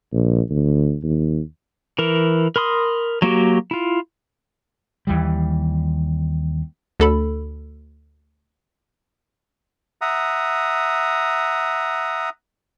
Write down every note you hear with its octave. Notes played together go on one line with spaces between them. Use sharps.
A#1
D2
D#2
E3 A#4
A#4 B5 C6 D#6
F#3 A#3 F#4 G4
E4 F4
D#2 E3 G3
D2 A4 B5
E5 F#5 A#5 D#6